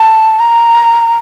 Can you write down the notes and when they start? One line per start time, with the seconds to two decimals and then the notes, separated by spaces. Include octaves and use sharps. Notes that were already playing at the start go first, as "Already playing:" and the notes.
Already playing: A5
0.40 A#5